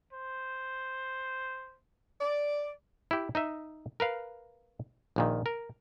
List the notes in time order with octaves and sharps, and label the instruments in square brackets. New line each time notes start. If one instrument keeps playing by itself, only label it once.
[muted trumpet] C5
[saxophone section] D5
[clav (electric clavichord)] E4 G4
D#4 D#5 E5
A#4 B4 F5
A#1 A#2 D#3
A#4